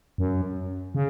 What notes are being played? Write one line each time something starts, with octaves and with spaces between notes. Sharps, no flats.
F#2
C#3